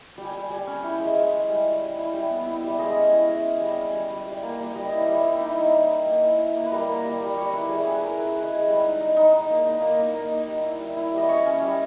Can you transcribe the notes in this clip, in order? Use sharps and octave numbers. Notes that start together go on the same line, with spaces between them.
G3 G5
G#5
G3 G5
G3 G#5
C#4
E4 G5
G#3
G#3 G#5
G#3
G3
G3
G3
E4
G3 G5
B3
E4
G3
G#3 D#5
C#4
E4
G#3
C#4
G3
C#4
G3
G3
G3
A#3
G3
G3 D#5
E4
G3
E4
D#4 G5
D#4
D#4
D#4
A#3 G#5
E4
E4
A#3
B4
G3 A#4
A#3
G3
G3
G3 C#5
E4 B4
G3 G#4
C#4 G#4
B4
E4 A#4
E4 B4
G#3 B4
G#3 G#4
G3 B4
D#4
D#4
D#4
D#4
A#3
D#4
A#3
D#4 D#5
A#3
D#4
G3
E4
G3
E4
G3 D#5
C#4 C#5
C#4
G3